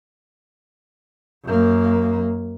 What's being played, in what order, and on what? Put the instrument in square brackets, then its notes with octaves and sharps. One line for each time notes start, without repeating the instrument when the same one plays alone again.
[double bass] F#2 A#3